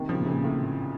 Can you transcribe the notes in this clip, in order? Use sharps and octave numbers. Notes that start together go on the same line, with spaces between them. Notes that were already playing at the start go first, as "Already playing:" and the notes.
Already playing: C3 D#3
C#3 F3
C3
A#2 C#3
A2 C3